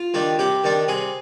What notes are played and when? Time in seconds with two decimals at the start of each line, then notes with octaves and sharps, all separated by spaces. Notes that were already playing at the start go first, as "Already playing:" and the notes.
Already playing: F4
0.14 D#3 G3 D4
0.39 C3 G4
0.64 D#3 G3 D4
0.88 C3 G#4